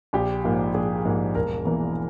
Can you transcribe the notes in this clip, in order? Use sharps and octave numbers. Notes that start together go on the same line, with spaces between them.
A#1 G4
G#2 F3 A#3
A#1 G#4
G#2 F3 A#3
E1 A#4
E2 E3 A#3